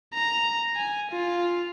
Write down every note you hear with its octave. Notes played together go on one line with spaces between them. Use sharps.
A#5
G#5
F4